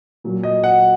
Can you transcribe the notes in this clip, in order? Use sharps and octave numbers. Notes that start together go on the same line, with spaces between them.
A#2 F#3
D#5
F#5